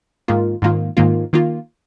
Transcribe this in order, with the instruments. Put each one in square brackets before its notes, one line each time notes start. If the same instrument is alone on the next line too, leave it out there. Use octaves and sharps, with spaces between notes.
[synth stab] G#2 D#3 A#3 F4
G#2 D#3 A#3 F4
G#2 D#3 A#3 F4
D#3 A#3 F4